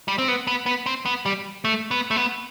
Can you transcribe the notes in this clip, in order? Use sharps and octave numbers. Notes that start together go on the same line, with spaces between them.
G3
C4
B3
B3
B3
C4
B3
G3
A3
B3
A3
B3